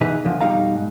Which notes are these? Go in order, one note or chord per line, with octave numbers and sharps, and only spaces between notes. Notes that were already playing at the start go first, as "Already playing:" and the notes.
B2 E3 D#4 G#4 B4
E2 D3 F3
F2 B2 G3 D#4 F5 A#5
G#2